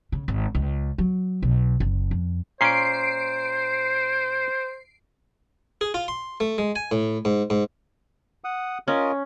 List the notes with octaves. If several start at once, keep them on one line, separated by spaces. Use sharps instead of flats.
C#3
G#1
C#2
F#3
B1
F#1
F2
A#2 C#4 C5 C7 D7
G#4
F4
C6
A3
G#3
G#5
A2
G#2
G#2
F#5 D#6
C#4 F4 A#4 D#5